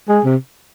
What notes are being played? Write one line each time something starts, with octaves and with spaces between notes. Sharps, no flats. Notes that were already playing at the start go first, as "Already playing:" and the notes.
G#3 G#4
C3